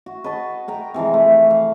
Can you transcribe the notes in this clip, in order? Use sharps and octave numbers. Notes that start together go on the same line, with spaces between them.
F#4
B4 D#5 A5 C#6
A#4 G5 A#5
C3 E3 F3 G#3
A3
F5